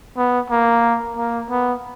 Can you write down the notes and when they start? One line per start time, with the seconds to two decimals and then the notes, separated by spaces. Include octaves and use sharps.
0.17 B3
0.50 A#3
1.17 A#3
1.50 B3